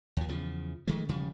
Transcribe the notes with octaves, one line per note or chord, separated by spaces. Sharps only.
D#2 F3
E2 C#3 F3
D#3 F3 G#3 A3
E1 C#3 F3 G3